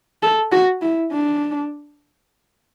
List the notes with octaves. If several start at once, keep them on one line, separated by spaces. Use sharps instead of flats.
A4
F#4
E4
D4